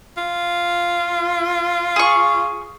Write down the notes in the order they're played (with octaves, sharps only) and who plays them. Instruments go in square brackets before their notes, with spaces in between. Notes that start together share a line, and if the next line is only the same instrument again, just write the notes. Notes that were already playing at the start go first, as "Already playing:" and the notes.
[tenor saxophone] F4
[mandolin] G#4 C#6